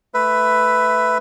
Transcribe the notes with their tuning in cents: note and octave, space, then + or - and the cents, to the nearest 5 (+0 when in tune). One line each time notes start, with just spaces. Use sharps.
A3 +0 B4 +10 E5 +0